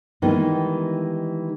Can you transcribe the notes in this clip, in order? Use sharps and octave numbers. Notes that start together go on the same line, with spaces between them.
D#3 E3 G3 G#3 B3 D#4